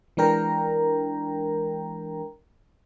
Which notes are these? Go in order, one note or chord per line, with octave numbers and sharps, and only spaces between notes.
E3 G#3 D4 A#4 G5 A#5